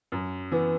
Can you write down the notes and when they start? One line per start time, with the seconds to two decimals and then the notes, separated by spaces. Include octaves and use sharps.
0.12 F#2
0.52 E3 B3